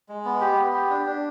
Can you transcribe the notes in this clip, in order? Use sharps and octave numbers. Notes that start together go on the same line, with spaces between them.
G#3
B3
G4
B3
G4
D4
D4